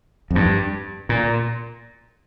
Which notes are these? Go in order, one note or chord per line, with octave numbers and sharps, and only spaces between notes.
F2
G2
A#2